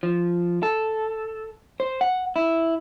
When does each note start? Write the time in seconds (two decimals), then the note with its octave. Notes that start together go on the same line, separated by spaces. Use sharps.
0.03 F3
0.63 A4
1.80 C5
2.01 F#5
2.36 E4